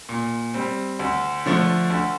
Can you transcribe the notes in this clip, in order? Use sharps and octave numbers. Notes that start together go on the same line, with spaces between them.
A#2
G3 C4
D2
D3 F3 A3
D2